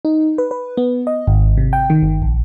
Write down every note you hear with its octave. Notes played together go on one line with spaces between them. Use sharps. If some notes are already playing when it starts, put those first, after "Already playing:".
D#4
B4
B4
B3
D#5
G#1
C3
G5
D#3
G1
A#1